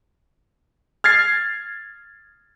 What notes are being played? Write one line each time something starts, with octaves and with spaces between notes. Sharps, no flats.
F6 G#6 A6 C7